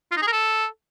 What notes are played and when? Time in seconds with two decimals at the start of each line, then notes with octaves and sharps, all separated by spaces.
0.11 F4
0.17 D#4
0.22 G#4
0.27 A#4
0.32 A4